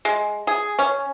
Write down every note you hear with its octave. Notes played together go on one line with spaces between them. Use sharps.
G#3
G#4
C#4